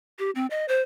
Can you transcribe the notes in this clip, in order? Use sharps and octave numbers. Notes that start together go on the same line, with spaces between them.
G4
C4
D#5
C5